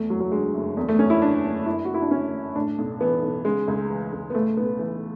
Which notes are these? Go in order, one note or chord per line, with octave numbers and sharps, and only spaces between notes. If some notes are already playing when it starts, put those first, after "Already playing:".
Already playing: E2 A3
F#1 F#3
F#3
D3 G#3
F#1
E2
A3
F#1 C#4
E4
D3 D4
F#1
F#2 E4
F#4
F#1
E4
D4
D3 C#4
F#1
A2 D4
B1
E3 B3
B1
C#3 G#3
C#2
E3
C#2
B3
A2 A3
B1 B3
E3